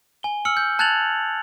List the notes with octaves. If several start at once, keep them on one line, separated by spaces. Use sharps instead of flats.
G#5 G7
E6 F6 C#7 F#7
G6
A5 F#6 G#6 A6 F7 F#7